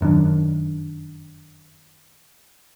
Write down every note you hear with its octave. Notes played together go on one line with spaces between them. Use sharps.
F1 F#2 D#3 D4